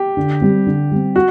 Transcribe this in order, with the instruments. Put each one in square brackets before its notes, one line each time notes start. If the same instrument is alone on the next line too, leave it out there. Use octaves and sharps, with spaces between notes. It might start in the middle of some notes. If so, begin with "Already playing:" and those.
Already playing: [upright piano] G4
[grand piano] D3
G3 C4
D3
G3 C4
[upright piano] F#4